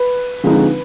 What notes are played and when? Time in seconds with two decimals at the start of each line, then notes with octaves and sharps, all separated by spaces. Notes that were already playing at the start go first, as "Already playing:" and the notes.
Already playing: B4
0.43 D3 F3 G#3 C4 D#4